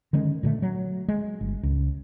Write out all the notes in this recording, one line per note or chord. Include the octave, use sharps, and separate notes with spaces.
D3 D#3 G#3 C#4
A#2 D3 A3
F#3
G#3
G1
C#2